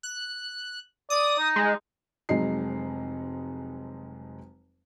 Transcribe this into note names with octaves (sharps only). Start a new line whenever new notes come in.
F#6
D5 D#6
D#4
G#3
F1 F2 F#3 G#3 D#4 C7